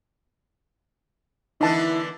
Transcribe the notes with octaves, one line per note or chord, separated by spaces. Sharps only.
D3 E3 B3 D#4 E4 A5